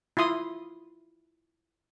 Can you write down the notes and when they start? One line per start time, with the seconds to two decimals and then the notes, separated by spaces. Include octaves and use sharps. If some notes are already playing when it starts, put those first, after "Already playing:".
0.17 E4 F4 C6 D#6